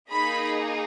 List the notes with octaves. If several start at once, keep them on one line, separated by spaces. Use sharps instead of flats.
A#3 D#4 G#4 B5